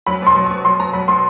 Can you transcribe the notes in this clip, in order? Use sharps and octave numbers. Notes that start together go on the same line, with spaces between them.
F#3 B5
B2 C6
F#3
C#6
B2
F#3 C6
B2 A#5
F#3 B5
B2 C6